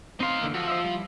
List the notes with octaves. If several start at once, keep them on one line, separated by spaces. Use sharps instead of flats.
C4 D#4 F5 C6
D3 E3 A#3
F3 F#4 A4
C5 D#5 E5
G3 E4